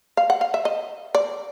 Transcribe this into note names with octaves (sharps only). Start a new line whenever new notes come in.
F5
F#5
F5
E5
D#5
D5